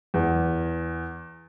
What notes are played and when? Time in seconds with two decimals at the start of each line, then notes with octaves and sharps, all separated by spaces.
0.14 E2